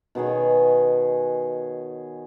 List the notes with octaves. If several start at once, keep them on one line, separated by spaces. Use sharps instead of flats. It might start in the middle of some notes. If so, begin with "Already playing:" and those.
B2 D#3 G#4 C#5